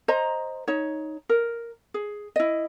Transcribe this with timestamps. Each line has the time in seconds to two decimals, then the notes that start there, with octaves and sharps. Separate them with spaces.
0.08 C5 D#5 A#5
0.68 D#4 C#5
1.29 A#4
1.94 G#4
2.36 E4 D#5